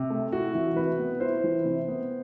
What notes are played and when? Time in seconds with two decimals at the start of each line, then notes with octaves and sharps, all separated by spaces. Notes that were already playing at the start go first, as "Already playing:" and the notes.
Already playing: C3
0.10 A3
0.32 E4 F#4
0.55 E3
0.76 C3 B4
0.99 B3
1.20 E4 C5
1.44 E3
1.65 C3
1.88 B3